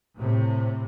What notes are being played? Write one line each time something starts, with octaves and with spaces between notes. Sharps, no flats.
A2 C3